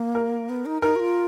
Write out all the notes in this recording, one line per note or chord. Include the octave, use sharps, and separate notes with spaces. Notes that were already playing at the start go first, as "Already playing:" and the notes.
Already playing: A#3
A#4
B3
D#4
D#4 A#4
F#4
F4